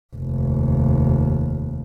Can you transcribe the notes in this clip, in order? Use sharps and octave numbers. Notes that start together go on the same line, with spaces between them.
F1 D#2